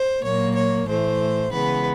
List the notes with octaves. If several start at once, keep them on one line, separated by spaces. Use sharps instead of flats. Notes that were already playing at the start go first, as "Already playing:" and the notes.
Already playing: C5
A#2 F#3 A#3 C#5
C#5
A2 E3 A3 C5
C#3 E3 G#3 B3 B4